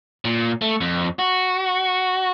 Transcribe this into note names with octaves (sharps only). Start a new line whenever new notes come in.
A#2
A3
F2
F#4